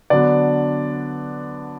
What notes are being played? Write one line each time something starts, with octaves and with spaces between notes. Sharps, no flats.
D3 F#3 B3 D4 D5